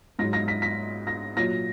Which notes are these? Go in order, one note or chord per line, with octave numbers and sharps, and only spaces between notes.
G#2 F#3 A#6
A#6
B6
B6
A#6
A#2 F#3 A#6